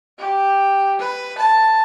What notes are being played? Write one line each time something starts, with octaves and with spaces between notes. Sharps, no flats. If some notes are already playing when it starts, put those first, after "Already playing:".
G4
B4
A5